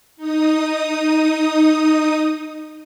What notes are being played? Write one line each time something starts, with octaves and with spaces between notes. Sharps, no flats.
D#4 D#6